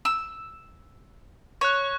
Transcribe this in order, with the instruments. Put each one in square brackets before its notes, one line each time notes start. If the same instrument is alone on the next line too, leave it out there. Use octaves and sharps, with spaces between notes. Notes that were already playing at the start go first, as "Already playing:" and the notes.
[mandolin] E6
[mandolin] C#5 [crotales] C#6 F#6